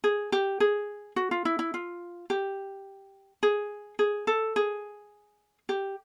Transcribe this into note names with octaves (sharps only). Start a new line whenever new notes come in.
G#4
G4
G#4
F#4
F4
E4
E4
F4
G4
G#4
G#4
A4
G#4
G4